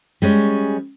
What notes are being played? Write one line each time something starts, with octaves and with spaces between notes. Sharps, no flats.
G3 G#3 C#4